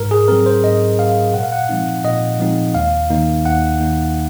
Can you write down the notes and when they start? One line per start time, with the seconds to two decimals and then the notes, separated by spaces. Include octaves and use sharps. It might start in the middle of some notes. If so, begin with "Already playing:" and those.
Already playing: G#2 A#4
0.11 G#4
0.28 F#3 C4 A#4
0.46 C5
0.63 G#2 D#5
0.99 F#3 C4 F5
1.34 A#2 F#5
1.43 F5
1.52 F#5
1.69 F3 G#3 C4 D#4
2.04 A#2 D#5
2.40 F3 G#3 C4 D#4
2.75 D#2 F5
3.10 D#3 A#3 D#4
3.45 D#2 F#5
3.80 D#3 A#3 D#4